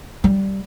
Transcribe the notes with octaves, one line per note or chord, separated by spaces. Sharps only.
G3